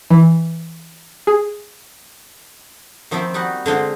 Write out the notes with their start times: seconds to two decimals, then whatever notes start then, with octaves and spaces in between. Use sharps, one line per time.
0.10 E3
1.27 G#4
3.11 D#3 F3 A#3 C4 E4
3.34 G3 D#4 F#4 F#5
3.66 D3 G#3 C4 F4